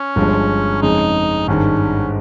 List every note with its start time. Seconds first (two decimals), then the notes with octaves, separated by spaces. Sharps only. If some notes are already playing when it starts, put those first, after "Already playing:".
Already playing: C#4
0.16 G1 G2 F3 G#3
0.82 F2 C#3 G#3 D#4
1.48 G#1 G2 D#3 G#3 C#4